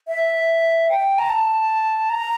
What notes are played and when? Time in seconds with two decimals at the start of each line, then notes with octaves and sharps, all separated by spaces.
0.08 E5
0.89 G5
1.18 A#5
1.29 A5
2.10 A#5